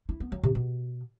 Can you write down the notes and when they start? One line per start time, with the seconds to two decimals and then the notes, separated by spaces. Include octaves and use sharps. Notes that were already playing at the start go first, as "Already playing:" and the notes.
0.09 E4
0.20 B3
0.32 F#3
0.43 C3
0.55 B2